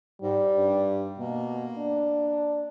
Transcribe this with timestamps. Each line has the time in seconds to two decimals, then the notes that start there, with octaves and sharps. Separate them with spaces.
0.22 G#2 G3
0.52 G2
1.18 B2 A#3
1.78 D4